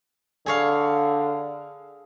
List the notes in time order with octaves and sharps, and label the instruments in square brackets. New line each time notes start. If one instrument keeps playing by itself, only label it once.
[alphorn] D3 [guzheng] G#4 C#5 F5